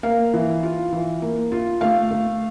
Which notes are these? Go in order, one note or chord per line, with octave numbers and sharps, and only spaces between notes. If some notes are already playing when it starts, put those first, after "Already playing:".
A#3 F5
E3
F4
E3
A#3
F4
A3 F5
A3